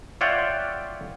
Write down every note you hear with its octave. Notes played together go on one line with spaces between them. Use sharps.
F4 C#5 D5 E5 F#5 G5